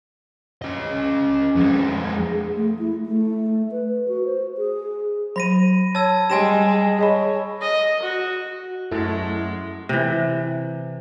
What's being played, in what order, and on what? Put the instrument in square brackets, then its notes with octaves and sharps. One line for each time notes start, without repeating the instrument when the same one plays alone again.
[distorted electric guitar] C#4 D#5
F2 G#3
[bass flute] G#4
A3
E4
A3
B4
F#4
C5
G#4
[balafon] F#3 [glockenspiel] B5 A#6 D#7
[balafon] C#5 [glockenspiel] A5 E6 G#6
[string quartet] G3 G#3 [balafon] G4 G5 C6 [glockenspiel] G#5 A#6 E7
[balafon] G#4 D#5 B5 [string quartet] C#5
[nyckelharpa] D#5
F#4
[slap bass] F#2 [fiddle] G#3 [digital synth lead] A3 [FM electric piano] E4
[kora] C3 E3